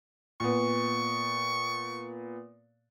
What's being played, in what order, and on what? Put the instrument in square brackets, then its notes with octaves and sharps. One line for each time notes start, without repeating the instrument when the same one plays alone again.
[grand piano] A#2 B3 [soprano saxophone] C#6